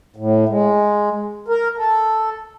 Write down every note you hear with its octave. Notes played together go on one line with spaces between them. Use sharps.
A2
G#3
A#4
A4